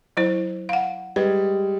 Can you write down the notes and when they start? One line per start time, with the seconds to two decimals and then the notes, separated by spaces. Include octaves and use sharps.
0.17 F#3 E4 C5
0.69 F5 F#5
1.16 G3 G#3 B4